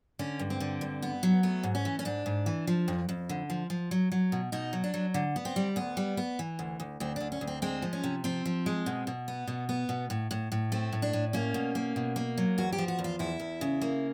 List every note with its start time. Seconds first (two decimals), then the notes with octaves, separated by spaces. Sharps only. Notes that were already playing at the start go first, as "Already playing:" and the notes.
0.19 D3 C#4
0.39 G2
0.50 C4
0.60 D3
0.81 G2
1.02 B3
1.23 F#3
1.43 A3 B3
1.63 G#2
1.75 C#4
1.85 E3
1.99 C#4
2.05 G#2 D4
2.26 G#2
2.46 E3
2.67 F3
2.88 F2
3.09 F2
3.29 D3
3.50 F3
3.70 F3
3.91 F#3
4.12 F#3
4.32 B2
4.52 B2 D#4
4.73 F#3
4.84 D4
4.94 F#3
5.14 D3
5.36 B3
5.45 C4
5.56 G3
5.76 D2 B3
5.97 G3
6.17 B3
6.39 E3
6.59 D2
6.80 D2
7.00 D2 C4
7.16 D2 D4
7.32 C#4
7.41 D2
7.47 C4
7.62 G#3 C4
7.82 F3
7.93 C#4
8.04 C3
8.24 F3 C4
8.45 F3
8.66 G#3
8.86 B2
9.07 B2
9.28 B3
9.47 B2
9.69 B3
9.89 B2
10.10 A2
10.31 A2
10.52 A2
10.72 A3 C4
10.93 A2
11.02 D4
11.13 A2
11.33 A#3 C#4
11.54 B2
11.75 A#3
11.96 B2
12.16 A#3
12.38 F#3
12.58 E2 F#4
12.72 G4
12.78 F3
12.88 F#4
12.99 E2
13.04 F4
13.19 E2 E4
13.40 E2
13.61 C#3
13.81 A#3